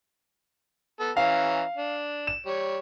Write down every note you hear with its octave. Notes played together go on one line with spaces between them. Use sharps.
B3 A4
E3 C#4 F5 A#5
D4
E7
G3 C#5